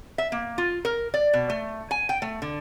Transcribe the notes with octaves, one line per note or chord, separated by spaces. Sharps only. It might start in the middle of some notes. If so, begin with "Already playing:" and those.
E5
A#3
F4
A#4
D5
B2
A3
G#5
G5
A3
D3